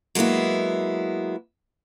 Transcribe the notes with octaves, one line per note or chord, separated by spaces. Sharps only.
F#3 G#3 A#3 B3 E4